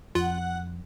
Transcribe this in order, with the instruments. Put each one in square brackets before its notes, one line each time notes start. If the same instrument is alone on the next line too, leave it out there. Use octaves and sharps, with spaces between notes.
[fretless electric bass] F2 [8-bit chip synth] F4 [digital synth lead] F#5